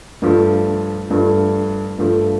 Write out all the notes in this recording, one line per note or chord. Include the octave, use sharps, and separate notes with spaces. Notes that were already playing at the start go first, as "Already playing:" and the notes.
G2 F3 A3
G2 F3 A3
G2 F3 A3